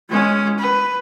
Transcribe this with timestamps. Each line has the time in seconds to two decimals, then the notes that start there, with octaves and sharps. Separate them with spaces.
0.10 G#3 C#4
0.59 B4